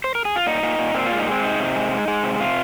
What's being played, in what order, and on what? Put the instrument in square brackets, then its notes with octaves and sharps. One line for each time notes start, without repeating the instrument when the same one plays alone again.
[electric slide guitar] C5
A#4
G#4
F4
A#2 D#4
A#2
A#2
A#2 C4
G#3 F4
D#4
G#3 C4
C3 D#4
C3
G#3
G#3
G#3
C3
C3 F4